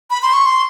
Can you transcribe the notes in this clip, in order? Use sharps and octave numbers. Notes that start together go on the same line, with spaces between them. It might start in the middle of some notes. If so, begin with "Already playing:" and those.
B5
C6
C#6
C6